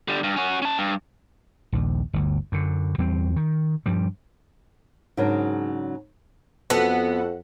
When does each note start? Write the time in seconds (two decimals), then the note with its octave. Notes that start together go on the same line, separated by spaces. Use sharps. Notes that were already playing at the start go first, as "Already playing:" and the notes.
0.08 D3 G3
0.24 G2
0.36 C#4 F#4
0.62 C#4 A5
0.78 G2
1.72 A#1 D#2
2.13 G1 D2
2.52 F#2 D3
2.98 E2 G3 C4
3.36 D#3
3.86 G2 F3 G3
5.17 G#2 C#3 F#3 D4 A#4
6.70 F2 B3 F#4 A4 F#5